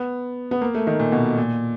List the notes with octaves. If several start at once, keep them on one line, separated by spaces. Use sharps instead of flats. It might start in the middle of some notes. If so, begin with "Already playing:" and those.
Already playing: B3
B3
A#3
A3
D#3
A#2
B2
A#2